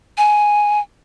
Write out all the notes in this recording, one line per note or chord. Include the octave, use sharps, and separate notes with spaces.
G#5